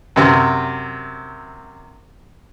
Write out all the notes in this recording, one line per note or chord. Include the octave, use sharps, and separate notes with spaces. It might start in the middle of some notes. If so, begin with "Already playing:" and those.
F#2 C3